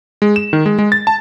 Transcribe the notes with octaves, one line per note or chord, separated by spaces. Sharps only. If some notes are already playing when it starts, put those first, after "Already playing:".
G#3
E7
D#3
G#3
G#3
A6
A5